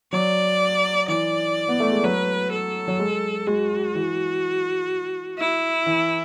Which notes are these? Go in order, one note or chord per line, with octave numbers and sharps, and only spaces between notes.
F#3 D5
E3 D5
B3
A3
G#3
F#3 B4
A4
F#3
G#3
G#3 F#4
E3
E4
E3